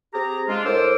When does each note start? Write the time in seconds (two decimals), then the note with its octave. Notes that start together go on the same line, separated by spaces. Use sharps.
0.14 C4 G4 G#4 A#5
0.48 G#3 D4 F4
0.65 A2 A#4 C5 D6 E6